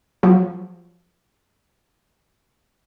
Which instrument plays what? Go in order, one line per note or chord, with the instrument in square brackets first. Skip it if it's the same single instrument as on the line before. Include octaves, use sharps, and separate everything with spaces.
[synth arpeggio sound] F3 F#3